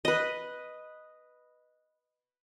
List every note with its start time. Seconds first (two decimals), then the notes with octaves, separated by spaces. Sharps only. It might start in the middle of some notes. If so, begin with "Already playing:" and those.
0.05 B4 D#5